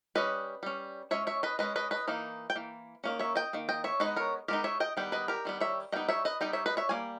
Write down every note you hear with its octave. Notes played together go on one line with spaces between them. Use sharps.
G3 C#4 B4 D#5
G3 C#4
G#3 C#4 C#5 E5
C#5 E5
B4 D#5
G#3 C#4 B4 D#5
B4 D#5
B4 D#5
E3 A#3 D#4
G5
E3 A#3
D#3 A#3 C#4
C#5 E5
D#5 G5
D#3 A#3
D#5 G5
C#5 E5
G#3 B3 D#4 B4 D#5
A#4 C#5
G#3 B3 D#4 G4 A#4
C#5 E5
D#5 G5
D#3 G3 B3 G5
B4 D#5
G4 A#4
D#3 G3 B3
C#5 E5
G3 B3 D#4 D#5 G5
C#5 E5
B4 D#5
G3 B3 D#4 D#5 G5
C#5 E5
B4 D#5
C#5 E5
G3 A#3 G#5